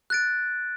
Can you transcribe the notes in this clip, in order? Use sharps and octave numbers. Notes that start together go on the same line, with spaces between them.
F#6 A6 D7